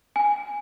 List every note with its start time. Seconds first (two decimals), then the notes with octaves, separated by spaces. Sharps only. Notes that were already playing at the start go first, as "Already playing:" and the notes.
0.16 G#5